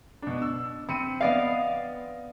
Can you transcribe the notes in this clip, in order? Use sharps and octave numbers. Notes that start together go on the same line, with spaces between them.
B2 D4
E6
C4 B5 C#7 D#7
B3 D5 D#5 F5